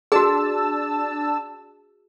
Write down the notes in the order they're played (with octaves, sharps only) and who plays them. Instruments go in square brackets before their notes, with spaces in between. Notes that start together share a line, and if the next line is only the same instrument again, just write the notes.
[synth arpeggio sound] D4 A5 E6 [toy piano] F#4 G#4